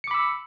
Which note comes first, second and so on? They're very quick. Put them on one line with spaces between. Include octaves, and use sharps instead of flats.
C#7 D6 B5 E6